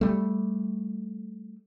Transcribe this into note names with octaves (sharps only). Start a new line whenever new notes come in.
G3 A3